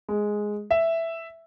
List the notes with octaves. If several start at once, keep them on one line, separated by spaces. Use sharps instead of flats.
G#3
E5